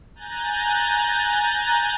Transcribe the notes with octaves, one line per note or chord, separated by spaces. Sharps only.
G#5 A#5 F#6 G6 A6